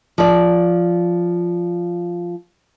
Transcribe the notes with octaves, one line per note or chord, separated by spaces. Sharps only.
F3 D5